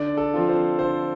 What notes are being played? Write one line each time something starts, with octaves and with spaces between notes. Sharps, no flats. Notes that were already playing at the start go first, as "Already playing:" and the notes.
Already playing: D3 D5
A4
F3 C4 F4
C5
D3 C5